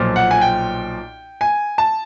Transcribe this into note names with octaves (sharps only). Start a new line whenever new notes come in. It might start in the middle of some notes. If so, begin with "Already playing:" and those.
Already playing: B1 A#2 F3
F#5
G#5
G5
G#5
A5